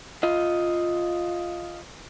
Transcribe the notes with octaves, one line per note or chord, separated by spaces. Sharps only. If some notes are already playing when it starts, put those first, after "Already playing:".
F4 D#5